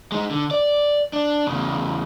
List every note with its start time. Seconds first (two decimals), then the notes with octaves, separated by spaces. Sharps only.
0.12 G#3 D#4
0.31 D3
0.51 D5
1.13 D4
1.47 E2 C#3